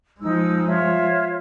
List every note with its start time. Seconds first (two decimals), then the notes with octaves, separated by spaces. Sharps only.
0.21 F3 G#3 D#4 E6
0.68 F4 C#5 E5